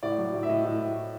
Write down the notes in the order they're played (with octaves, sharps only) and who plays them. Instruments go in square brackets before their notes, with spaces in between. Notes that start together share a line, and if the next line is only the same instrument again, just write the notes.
[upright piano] A2 D5
F#3
A2
E5
A2 D#5
A2
A2